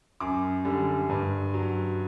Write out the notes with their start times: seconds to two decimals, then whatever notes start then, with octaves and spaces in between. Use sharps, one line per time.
0.20 F#2 D6
0.65 D3 G3
1.09 G2
1.54 F#3